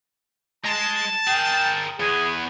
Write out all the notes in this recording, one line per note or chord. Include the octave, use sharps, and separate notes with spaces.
G#3 A5
G#4 A#4 G5
E2 B3 G#4